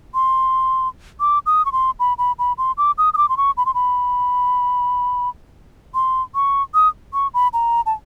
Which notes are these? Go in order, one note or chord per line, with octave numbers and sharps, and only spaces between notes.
C6
D6
D#6
C#6
C6
B5
B5
B5
C6
D6
D#6
D#6
D6
C6
C#6
B5
C6
B5
C6
C#6
D#6
C#6
B5
A#5
A5